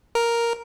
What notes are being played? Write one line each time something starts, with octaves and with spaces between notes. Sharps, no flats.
A#4